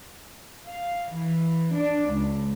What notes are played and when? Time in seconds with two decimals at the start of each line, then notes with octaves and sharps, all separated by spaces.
0.67 F5
1.14 E3
1.76 D4
2.14 C#2